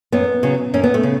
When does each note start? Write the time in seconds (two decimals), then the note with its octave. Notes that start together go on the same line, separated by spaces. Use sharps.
0.12 F#2 B3
0.43 C#3 F#3
0.74 F#2 C#4
0.83 B3
0.94 A3
1.03 C#3